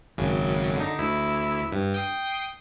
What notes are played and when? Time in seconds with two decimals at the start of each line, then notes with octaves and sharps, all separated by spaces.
0.17 G#1 F#2 C#3
0.76 D3 D#4
0.99 D2 E4
1.72 G2
1.94 G5 D#6 C7